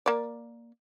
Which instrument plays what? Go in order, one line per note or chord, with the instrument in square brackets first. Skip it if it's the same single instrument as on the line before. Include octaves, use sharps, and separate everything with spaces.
[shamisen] A#3 D5